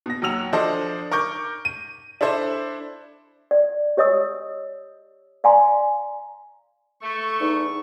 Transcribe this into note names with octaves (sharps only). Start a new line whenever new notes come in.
B2 A#6
D#2 F#3 F#5 E6 F7
F3 D4 A4 C5 D5 D#5
A#4 C#6 D6 G6
D#7
D4 E4 A4 C5 E5
D5
G4 C#5 D#5 D#6 E6
D5 F5 G#5 A#5 C6
A3 C#6
E2 D#4